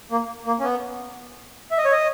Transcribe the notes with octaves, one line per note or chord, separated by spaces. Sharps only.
A#3
A#3
C#4
B3
E5
D#5
C#5
D#5